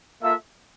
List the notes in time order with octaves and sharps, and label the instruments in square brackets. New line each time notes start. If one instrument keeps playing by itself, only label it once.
[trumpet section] A#3 F4 A4 E5